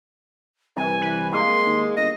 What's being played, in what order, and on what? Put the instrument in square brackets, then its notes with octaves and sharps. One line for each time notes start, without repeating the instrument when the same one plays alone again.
[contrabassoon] C2 [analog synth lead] E3 [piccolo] G#5
[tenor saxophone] E3 [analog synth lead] B4
[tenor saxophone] G#3 [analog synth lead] A#3 [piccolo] C6
[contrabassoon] D#2
[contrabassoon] G1 [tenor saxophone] D#5 [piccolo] A#6